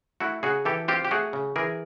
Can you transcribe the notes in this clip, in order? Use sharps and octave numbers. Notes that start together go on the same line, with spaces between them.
A3 E4 F#4
C#3 F#4 G#4
E3 G4 A4
C4 F4 G4
G4
A3 F#4 G#4
C#3
E3 G#4 A#4